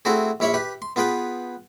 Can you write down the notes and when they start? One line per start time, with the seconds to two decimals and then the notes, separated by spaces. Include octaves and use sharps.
0.05 A3 C4 E4 F#4 G#4
0.40 A#1 E4 C#5 B5 C#6
0.54 G4 B4
0.82 C6
0.96 B3 F4 G#4 B4 G5